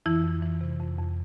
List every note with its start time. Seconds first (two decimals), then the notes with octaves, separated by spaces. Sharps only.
0.06 F2 E3 E4
0.24 F2
0.43 E3
0.61 C3
0.80 F2
0.98 F2